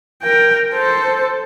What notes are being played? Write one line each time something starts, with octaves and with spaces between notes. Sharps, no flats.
A#4 G5
A4 C5